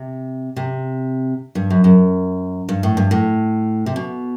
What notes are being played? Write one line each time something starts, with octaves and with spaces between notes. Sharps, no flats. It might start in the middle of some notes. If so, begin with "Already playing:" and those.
Already playing: C3
C3
G2
F#2
F#2
G2
A2
G2
A2
C3
B2